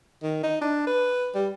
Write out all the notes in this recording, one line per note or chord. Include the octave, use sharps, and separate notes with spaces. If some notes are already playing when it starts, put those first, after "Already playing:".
D#3
D#4
D4
B4
G3